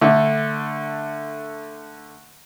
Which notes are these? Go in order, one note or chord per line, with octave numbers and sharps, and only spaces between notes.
D3 A3